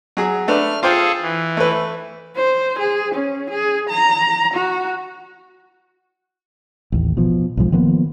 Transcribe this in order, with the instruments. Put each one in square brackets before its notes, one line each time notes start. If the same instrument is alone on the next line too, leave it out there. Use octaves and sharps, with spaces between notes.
[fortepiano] F#3 G#4
[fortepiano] A3 D4 B4 [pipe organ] F6
[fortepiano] F4 C5 G5 [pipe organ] G#4 A4 F5
[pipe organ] E3
[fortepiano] A3 B4
[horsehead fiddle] C5
G#4
C#4
G#4
A#5
F#4
[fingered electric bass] A1 D#2
B2 F3
B1 G#2 F3 G#3
D#3 F3 A#3 B3